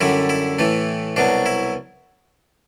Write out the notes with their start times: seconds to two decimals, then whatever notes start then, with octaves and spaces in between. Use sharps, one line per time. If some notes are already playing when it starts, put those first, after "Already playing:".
0.01 F#2 D3 G3 E4
0.29 E4
0.59 A2 E3 A3
1.17 C2 B2 F#3 D4
1.46 E4